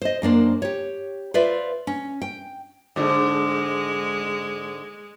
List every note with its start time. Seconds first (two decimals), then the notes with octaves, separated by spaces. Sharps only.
0.02 C5 D#5
0.22 F#2 A#3 D4 C5
0.62 G4 C#5
1.34 F4 B4 C5 D5 E5
1.87 C#4
2.22 G5
2.96 G#2 D3 G#3